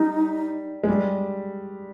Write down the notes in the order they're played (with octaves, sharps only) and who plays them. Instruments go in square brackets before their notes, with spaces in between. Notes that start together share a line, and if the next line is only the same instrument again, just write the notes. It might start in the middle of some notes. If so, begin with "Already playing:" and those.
Already playing: [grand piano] G3 [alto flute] D#4
[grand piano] G#3
G3